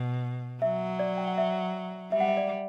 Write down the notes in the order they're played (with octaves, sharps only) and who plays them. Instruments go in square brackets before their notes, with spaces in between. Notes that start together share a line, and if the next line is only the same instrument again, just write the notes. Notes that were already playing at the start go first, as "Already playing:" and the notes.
Already playing: [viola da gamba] B2
[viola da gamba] F#3 [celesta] E5
[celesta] D5
G5
F#5
E5
[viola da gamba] G3 [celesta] E5
[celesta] F#5
E5
D5